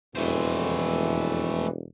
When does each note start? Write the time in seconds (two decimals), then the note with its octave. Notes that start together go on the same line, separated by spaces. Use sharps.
0.15 E1 F2 E3 A3 C5